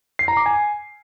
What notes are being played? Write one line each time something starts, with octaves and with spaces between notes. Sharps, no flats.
C7
A#5
D6
G#5